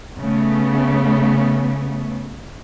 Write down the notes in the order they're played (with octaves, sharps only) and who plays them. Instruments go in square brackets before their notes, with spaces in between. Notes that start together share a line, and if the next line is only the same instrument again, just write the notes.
[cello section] C#3 A3 B3